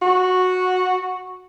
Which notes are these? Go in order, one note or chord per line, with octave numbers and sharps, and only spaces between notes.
F#4